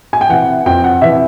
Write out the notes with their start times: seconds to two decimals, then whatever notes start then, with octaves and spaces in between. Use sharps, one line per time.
0.13 G#5
0.21 G5
0.29 C3 E3 F#5
0.66 F2 G5
0.84 F#5
1.02 C3 E3 E5